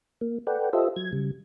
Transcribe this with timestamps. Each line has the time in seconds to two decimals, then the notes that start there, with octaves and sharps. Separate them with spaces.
0.21 A#3
0.47 A4 B4 D5 F#5 G5
0.73 F4 G4 A4 C5 D#5 E5
0.96 F#3 G#6
1.13 C#3 G3